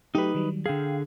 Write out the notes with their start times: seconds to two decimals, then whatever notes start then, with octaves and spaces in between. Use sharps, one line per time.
0.15 F#3 A3 D#4 G4 B4
0.35 D#3 F#3 G3
0.66 D3 G#4 F5 G5